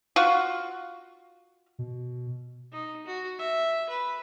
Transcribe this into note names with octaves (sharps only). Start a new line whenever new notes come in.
F4 F#4
B2
D#4
F#4
E5
B4